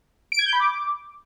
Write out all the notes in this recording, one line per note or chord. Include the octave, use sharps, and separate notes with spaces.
D7
G#6
G6
B5
D6